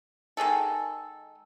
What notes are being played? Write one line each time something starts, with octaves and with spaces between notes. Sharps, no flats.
D#3 G#3 G#4 A4